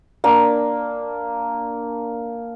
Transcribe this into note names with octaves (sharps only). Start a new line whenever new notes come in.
A#3 D4